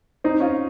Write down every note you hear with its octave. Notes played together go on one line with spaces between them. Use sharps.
C4 D#4
C#4 F4